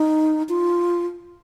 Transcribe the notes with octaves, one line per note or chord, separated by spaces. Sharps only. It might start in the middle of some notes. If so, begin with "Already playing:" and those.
Already playing: D#4
F4